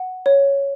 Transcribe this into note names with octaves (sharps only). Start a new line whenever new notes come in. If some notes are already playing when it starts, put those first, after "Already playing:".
Already playing: F#5
C#5